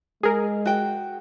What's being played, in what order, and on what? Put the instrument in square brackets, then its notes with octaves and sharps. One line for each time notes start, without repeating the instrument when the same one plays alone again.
[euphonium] G#3 [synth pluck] G#4 A#4
[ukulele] F#4 G5